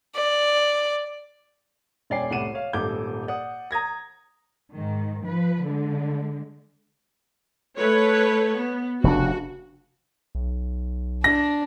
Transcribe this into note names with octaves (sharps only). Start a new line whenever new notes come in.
D5
E1 C#4 D5 G5 G#5 C7
C2 A2 F#5 D6 D#7 E7
C#5 F5
D#1 G#1 A4 D6 G6
D5 F#5 D#6
A#5 D#6 G#6 A#6
G#2 D#3
F3 B4
D3 G#3
A3 B4 C#5
B3
F1 C#3 D4 F#4
B1
D4 A#6